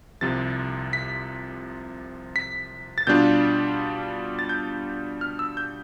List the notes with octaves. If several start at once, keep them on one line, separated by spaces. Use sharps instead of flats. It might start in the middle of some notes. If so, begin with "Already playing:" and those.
C2 C3 F3 A6
B6
B6
A6
B2 G3 D4 F4 G6
A6
G6
F6
E6
G6